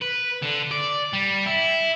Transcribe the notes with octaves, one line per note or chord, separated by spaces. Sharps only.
B4
D3
D5
G3
E4